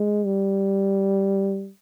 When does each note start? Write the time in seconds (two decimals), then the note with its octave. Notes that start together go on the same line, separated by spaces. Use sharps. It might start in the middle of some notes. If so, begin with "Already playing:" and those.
Already playing: G#3
0.26 G3